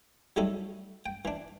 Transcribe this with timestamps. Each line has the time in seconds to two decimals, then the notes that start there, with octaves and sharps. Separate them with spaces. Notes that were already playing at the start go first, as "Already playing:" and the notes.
0.36 F#3 G3 A3 D#4 E4 A4
1.06 G5
1.25 E3 D4